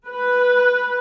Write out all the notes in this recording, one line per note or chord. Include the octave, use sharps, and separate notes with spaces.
B4